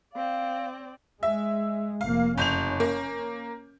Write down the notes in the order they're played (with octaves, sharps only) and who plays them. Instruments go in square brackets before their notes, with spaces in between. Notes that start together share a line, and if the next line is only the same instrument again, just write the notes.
[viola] C4 D5 [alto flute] F5
[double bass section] G#3 [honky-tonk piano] E5
[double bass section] F1 A#3 [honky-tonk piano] F5
[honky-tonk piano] F#1 G6 F7 [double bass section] C#4
[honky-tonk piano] A#3